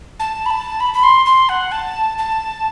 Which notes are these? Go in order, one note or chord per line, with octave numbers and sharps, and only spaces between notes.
A5
B5
A5
B5
B5
C6
C6
F#5
A5
A5